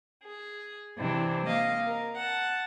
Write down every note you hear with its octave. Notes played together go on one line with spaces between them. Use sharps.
G#4
C3 E3 C4 D4
A#3 D#5 F5
A#4
F#5 A5